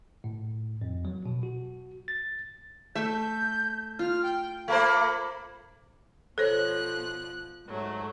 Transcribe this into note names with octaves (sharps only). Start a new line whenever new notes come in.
A2
F2
F#3
B2
F#4
A6
A3 E5 G6
F4 F6
G5
A3 A#3 C5 B5
B2 F3 A4 C5 C#5 F#6
G#2 F#3 A3